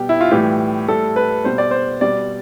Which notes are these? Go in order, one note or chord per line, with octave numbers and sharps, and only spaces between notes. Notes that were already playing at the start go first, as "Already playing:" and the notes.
Already playing: B2 G3 G4
E4
F4
A2 E3 G3 G4
A2 G3 A4
B4
B2 G3 C5
D5
C5
B2 G3 D5